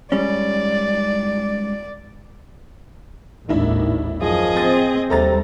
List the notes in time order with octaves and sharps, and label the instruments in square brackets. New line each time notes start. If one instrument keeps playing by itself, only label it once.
[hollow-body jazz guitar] G#2 G3 C#4 [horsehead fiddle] D5
[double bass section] G#1 D#2 A2 [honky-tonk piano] D#3 D4 E4
[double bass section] F#2 [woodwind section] F3 [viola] G#4 D#5
[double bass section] C4 [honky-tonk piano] A6
[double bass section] D#2 G3 [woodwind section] C3 [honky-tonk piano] A4 A#5 A6